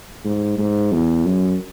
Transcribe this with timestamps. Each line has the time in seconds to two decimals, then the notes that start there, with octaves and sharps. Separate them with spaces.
0.25 G#2
0.58 G#2
0.92 E2
1.26 F#2